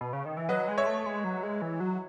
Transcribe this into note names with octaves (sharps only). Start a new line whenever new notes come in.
B2
C#3
D#3
E3
F#3 B4 D#5
G#3
C#5 E5
A3
G#3
F#3
G#3
E3
F#3